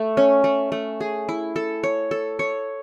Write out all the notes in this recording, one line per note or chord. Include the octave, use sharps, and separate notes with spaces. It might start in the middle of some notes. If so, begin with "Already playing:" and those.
Already playing: A3
C#4
A3
A3
G#4
E4
A4
C#5
A4
C#5